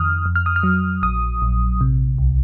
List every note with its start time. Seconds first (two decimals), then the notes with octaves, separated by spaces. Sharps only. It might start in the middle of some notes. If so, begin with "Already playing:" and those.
Already playing: F2 D#3 D#6 F6
0.26 F2
0.35 F6
0.46 D#6
0.56 F6
0.63 F#3
1.03 A#1 D#6
1.42 A#1
1.81 C3
2.18 C2